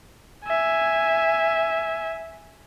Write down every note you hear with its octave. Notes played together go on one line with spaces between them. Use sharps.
E5 G#5